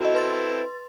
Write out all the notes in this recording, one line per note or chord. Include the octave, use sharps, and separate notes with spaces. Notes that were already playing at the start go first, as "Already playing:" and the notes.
C4 E4 F#4 A4 D#5
B4 C6 A6